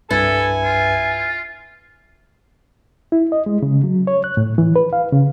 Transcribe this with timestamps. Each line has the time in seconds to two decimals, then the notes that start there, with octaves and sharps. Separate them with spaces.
0.11 C2 G2 E4 A4 B4 G#5
0.64 F4
3.12 E4
3.32 D#5
3.46 G#3
3.63 C#3
3.84 F#3
4.07 C#5
4.24 F#6
4.37 A2
4.58 E3
4.76 B4
4.93 F5
5.13 C#3